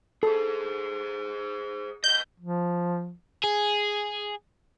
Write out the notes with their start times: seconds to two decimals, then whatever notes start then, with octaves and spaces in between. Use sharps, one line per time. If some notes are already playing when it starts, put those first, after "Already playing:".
0.23 G#4 A4 C5
2.04 B4 D#5 G6
2.40 F3
3.44 G#4